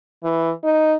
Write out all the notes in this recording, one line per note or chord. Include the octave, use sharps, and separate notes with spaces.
E3
D#4